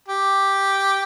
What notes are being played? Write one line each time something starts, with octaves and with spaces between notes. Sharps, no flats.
G4